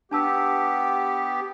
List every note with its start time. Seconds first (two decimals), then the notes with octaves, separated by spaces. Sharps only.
0.11 B3 D4 G4 A5 E6